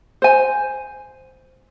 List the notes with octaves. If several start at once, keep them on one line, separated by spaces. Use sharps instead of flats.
C5 G#5